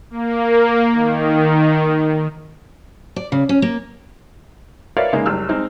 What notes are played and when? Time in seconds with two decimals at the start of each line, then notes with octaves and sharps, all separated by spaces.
0.11 A#3
0.92 D#3
3.16 D5
3.32 C#3
3.49 C#4
3.62 A#3
4.97 A#4 B4 C#5 D5 E5 F5
5.13 C#3 G#3 A#3 D#4
5.26 F#1 G3 E6 F6
5.49 G#3 C4 D#4